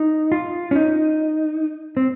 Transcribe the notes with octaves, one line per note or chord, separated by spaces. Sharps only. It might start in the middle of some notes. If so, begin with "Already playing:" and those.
Already playing: D#4
F4
C#4
D#4
C4